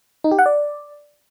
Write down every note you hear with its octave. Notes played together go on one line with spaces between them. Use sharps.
D#4
G4
F#5
D5